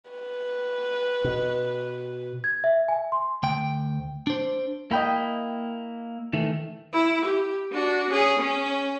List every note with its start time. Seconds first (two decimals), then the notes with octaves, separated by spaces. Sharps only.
0.10 B4
1.24 B2
2.44 G#6
2.64 E5
2.88 G#5
3.12 C6
3.43 D2 G5
4.27 D4 C5
4.91 A#3 E4 D#5 G5 B5
6.33 D#3 E3 A3
6.93 E4
7.25 G4
7.72 D4 F#4
8.10 C#4 G#4
8.39 C#4